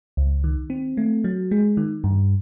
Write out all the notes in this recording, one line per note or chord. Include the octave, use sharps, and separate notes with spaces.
C#2
D#3
C4
A3
F#3
G#3
D#3
G2